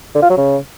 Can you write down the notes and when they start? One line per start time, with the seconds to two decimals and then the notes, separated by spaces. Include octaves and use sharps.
0.15 D3
0.22 F4
0.30 F#3
0.38 C#3